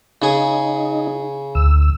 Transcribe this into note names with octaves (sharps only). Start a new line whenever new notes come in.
C#3 D#4 G#4
D2 E6